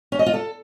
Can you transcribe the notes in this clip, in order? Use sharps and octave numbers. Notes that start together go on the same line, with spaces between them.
C#4
D#5
F4
A4